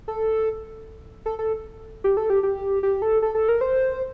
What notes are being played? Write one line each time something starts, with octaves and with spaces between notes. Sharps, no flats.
A4
A4
A4
G4
A4
G4
G4
G4
A4
A4
A4
A#4
C5